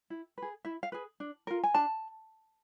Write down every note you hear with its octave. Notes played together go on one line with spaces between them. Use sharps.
E4
G#4 B4
E4 E5
F5
G#4 B4
D4
F4 A#4
G#5
D4 A5